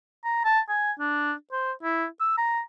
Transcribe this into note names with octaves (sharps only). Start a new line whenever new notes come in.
A#5
A5
G#5
D4
C5
E4
E6
A#5